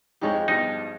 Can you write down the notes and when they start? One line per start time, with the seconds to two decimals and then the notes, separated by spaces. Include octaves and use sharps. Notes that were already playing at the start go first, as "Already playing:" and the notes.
0.21 F2 F3 G#3 D#4 G4 C#5
0.48 G2 B2 D#4